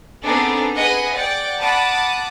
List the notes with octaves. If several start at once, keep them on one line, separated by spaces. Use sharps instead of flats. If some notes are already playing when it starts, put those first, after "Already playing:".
B3 C4 D4 D#4 G#4 A4
G#4 B4 D#5 F#5
D5 F#5 G5
F#5 A5 B5 D6 D#6